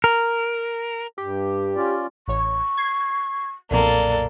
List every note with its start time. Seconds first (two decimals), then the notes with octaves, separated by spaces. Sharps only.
0.04 A#4
1.18 G2 G4
1.76 C#4 F4 D5
2.28 A1 C#5 C#6
2.77 G#6 C7
3.71 B1 F2 A#2 A#3 A4 D5